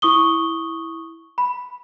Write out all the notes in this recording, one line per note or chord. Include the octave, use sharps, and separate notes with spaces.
E4 C#6 D#6 G7
B5